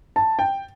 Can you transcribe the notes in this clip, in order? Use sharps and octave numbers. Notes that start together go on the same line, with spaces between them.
A5
G5